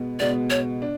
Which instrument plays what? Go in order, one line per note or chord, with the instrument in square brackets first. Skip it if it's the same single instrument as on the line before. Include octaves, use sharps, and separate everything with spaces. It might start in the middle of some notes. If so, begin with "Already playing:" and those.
Already playing: [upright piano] B2 G#3 B3
[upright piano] B2 G#3 B3 [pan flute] D5
[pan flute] C#5
[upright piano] D4